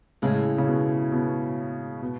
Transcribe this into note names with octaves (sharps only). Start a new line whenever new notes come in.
A2 C#3 G#3 C#4 E4 G#4
C#3
B2
B2
B2